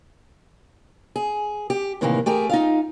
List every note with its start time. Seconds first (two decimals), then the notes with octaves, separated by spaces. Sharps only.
1.16 G#4
1.70 G4
2.01 A2 C3 D#3 E3 A3 A#3
2.26 A3 G4 G#4 A#4
2.49 D#4 F4 F5